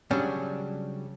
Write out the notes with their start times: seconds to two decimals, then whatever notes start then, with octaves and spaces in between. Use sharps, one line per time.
0.11 C#3 F#3 G3 C#4 D4